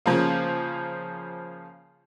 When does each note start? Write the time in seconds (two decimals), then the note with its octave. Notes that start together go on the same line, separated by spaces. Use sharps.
0.06 C#3 F3 A#3